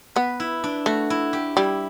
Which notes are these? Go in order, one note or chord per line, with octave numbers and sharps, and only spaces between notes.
B3 B4
E4
D4
A3 F#4
E4
G4
G3 E4